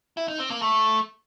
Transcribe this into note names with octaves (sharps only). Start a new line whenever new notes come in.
E4
D#4
C4
A#3
A3